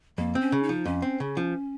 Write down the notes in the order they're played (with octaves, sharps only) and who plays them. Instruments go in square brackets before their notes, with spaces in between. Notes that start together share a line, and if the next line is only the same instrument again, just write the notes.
[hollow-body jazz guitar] F2 [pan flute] A#3
[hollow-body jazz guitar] C4
[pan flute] C#4
[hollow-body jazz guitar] C#3
[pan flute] D#4
[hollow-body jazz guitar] F3
[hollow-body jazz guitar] F2 [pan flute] C#4
[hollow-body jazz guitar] C4
C#3
F3